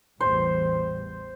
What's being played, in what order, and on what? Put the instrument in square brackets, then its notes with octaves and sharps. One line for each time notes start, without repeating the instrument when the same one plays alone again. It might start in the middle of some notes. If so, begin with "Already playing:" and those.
[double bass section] A1 E2 G3 [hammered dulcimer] C5